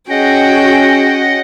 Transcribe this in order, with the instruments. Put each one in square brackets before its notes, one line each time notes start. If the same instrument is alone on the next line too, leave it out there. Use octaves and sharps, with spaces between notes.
[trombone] C#4 [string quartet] F#4 G#4 G5 [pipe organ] D#5 F#5